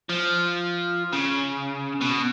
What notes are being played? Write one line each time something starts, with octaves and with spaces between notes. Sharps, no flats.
F3
C#3
B2